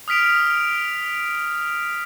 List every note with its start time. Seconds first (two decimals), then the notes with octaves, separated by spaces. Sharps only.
0.08 D#6 F6 B6 D7 F7